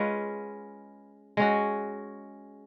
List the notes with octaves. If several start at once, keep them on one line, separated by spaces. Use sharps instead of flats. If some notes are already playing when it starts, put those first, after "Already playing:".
Already playing: G#3 C#4 F4 B4
G#3 C#4 F#4